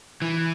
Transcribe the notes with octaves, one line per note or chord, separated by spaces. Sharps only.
E3